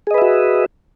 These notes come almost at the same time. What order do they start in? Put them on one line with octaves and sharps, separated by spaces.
G#4 D#5 B4 E5 F#4